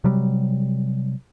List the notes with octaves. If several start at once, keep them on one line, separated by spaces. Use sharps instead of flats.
C3 F#3 G3